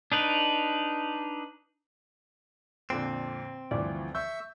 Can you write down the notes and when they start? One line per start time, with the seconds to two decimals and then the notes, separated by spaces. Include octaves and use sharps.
0.12 D4 D#4 B4
2.90 F2 A#2 D3 C4
3.71 D2 G2 E3 F3 D5
4.15 E5 C#6 E6 G6